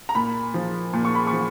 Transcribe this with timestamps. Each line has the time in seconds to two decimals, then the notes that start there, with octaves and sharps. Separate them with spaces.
0.09 A#5
0.15 A#2 B5
0.54 F3
0.93 A#2
1.05 C#6
1.15 B5
1.27 C#6
1.33 F3